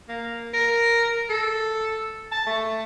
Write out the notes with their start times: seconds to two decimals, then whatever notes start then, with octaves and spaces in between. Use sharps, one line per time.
0.08 A#3
0.53 A#4
1.29 A4
2.32 A5
2.46 A3